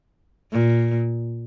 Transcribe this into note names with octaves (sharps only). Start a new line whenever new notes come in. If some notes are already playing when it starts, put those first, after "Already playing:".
A#2